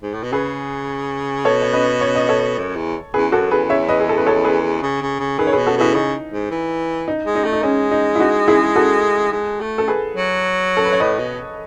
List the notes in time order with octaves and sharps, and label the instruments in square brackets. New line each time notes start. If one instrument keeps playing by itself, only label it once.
[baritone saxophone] G#2
A2
B2
[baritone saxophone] C#3 [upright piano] G#4 B4
[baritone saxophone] B2 [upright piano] A4 C#5
[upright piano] C#5
B4 D#5
C#5
D#5
A4 C#5
[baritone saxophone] F#2
E2
[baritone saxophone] E2 [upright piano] G#4 B4
[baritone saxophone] F#2 [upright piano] F#4 A4
[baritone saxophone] E2 [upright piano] G#4 B4
[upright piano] C#5 E5
B4 D#5
G#4
A4
B4
A4 C#5
G#4 B4
[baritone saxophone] C#3
C#3
C#3
[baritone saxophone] D#3 [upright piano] G#4 B4
[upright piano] C#5
[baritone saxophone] B2 [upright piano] G#4 B4
[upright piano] F#4 A4
[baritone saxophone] B2 [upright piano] E4 G#4
[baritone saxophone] C#3 [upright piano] D#4
[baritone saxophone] G#2
E3
[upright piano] D#4
[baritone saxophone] G#3
[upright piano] D#4
[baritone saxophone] A3
[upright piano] D#4
[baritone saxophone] G#3 [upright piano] C#4
[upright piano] D#4
E4
D#4 F#4
E4 G#4
F#4 A4
[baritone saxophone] G#3
A3
[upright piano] A4
G#4 B4
[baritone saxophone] F#3
[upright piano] A4
B4
C#5
[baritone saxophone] A2 [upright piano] B4 D#5
[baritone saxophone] B2